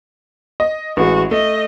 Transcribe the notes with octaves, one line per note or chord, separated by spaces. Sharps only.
D#5
A1 G#3 F#4
A3 D#5